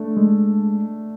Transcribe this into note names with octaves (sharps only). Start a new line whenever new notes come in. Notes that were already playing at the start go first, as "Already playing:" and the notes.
Already playing: A3 D4
G#3